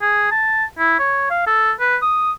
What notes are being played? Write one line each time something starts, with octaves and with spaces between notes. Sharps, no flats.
G#4
A5
E4
C#5
F5
A4
B4
D#6